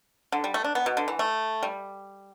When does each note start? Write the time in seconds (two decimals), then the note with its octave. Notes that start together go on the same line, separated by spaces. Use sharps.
0.32 D3
0.44 G3
0.54 A3
0.64 D4
0.75 B3
0.86 B2
0.97 D3
1.08 E3
1.19 A3
1.63 G3